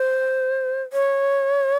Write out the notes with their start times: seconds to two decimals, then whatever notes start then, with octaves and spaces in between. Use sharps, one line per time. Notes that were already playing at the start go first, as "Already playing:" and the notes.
Already playing: C5
0.93 C#5